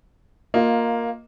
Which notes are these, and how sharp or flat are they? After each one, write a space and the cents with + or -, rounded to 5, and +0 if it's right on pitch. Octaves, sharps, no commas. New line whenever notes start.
A#3 +0 F4 +15 D#5 +5